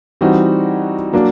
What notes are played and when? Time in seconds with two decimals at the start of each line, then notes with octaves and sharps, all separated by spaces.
0.21 E3 G3 C4 D#4 F#4
1.13 F#3 A#3 D4